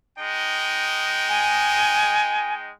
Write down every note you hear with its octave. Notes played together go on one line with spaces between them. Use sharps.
G#3 D#4 G5
G#5